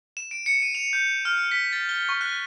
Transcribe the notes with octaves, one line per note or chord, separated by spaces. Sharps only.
E7
D7
C#7
D#7
F7
G6
F6
B6
A6
G7
C#6
F#6